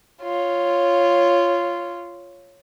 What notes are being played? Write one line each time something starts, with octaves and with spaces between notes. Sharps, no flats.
F4 C#5